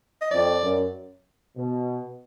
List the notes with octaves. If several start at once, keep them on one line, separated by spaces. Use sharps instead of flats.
D#5
F2 D5
F#2
B2